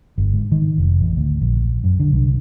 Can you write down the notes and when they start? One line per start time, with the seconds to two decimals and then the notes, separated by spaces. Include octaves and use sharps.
0.18 G1
0.34 G#2
0.52 D#3
0.78 F1
1.01 A1
1.17 D2
1.41 A#1
1.84 F#2
2.00 D3
2.13 C2